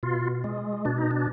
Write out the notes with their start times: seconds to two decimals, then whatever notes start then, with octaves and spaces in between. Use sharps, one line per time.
0.03 B2 F4
0.44 G#3
0.85 B2 D4
0.98 D#4
1.11 D4